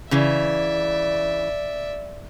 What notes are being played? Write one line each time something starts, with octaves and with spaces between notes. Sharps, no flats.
C#3 E3 D5 E5